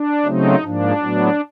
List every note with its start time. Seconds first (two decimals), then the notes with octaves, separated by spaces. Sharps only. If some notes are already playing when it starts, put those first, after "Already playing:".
Already playing: D4
0.25 C#3 F#3 A3 C4 D#4
0.63 G#2 F3 A#3 D4
1.00 A2 F#3 B3